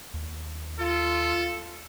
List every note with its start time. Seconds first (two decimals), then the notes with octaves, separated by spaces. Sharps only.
0.14 D#2
0.80 F4 A4